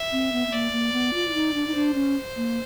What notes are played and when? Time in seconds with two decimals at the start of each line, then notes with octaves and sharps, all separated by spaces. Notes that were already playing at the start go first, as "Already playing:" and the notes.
Already playing: E5
0.12 C4
0.32 B3
0.47 B3
0.52 A#3 D5
0.72 A#3
0.93 B3
1.14 F4
1.28 E4
1.34 D#4
1.54 D4
1.67 D#4
1.75 D4 C5
1.94 C#4
2.36 A#3